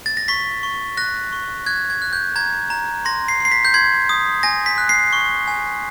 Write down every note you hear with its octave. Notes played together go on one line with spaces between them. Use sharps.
A6
A#6
C#6 B6
C#6
F#6 A#6
C#6
F#6 G#6
G#6
F#6
G6
A#5 G#6
A#5
C6 A#6
C7
C6 C7
B6
G6
C6 G#6
D#6
G#5 A#6
B6
F#6
C7
C#6
G#5